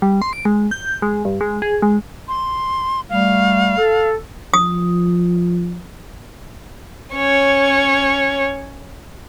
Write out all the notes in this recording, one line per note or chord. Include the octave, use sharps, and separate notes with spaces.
G3
C6
D7
G#3
G6
G#3
G2
G#3
G#4
G#3
C6
G3 A3 F5
A4
F3 D#6
C#4 C#5